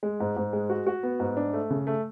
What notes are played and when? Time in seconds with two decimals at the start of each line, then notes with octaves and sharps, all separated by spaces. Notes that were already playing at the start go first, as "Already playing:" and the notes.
0.03 G#3
0.20 G#2
0.36 G#2
0.53 G#3
0.70 F#4
0.87 F#4
1.03 B3
1.20 G#2
1.37 D4
1.53 A3
1.70 C#3
1.87 A3